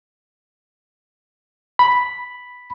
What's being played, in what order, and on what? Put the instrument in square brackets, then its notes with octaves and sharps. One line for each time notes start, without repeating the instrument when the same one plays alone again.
[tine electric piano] B5